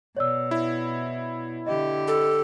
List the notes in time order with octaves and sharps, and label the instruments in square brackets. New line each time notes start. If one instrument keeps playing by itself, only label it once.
[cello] B2 [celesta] C#5 D5 E6
[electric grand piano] E4
[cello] D3 G4 [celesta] D#5
[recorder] A4